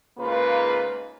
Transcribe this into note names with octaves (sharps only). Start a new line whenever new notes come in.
G#2 C#3 A#3 F4 B4